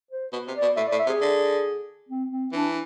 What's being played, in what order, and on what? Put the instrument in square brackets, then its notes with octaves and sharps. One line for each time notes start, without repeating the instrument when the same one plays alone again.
[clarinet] C5
[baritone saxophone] B2 [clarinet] B4
[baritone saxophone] C3
[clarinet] D5
[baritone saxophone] B2
[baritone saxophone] A2 [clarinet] E5
[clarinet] D5
[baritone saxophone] A2
[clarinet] E5
[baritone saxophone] C3
[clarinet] G#4
[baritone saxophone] D3
[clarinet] C4
C4
[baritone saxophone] E3 [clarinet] D4